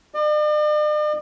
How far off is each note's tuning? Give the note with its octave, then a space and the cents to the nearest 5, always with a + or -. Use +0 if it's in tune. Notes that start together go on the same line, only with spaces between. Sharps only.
D5 +45